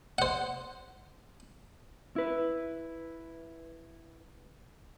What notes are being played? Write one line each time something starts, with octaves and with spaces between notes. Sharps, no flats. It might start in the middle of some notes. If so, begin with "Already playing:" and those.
C5 F#5
E4 B4